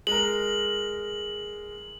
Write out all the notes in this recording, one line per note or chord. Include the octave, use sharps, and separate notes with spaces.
G#3 A#4 F#7